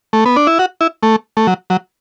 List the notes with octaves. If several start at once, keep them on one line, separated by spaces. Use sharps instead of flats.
A3
B3
D4
E4
F#4
E4
A3
A3
F#3
F#3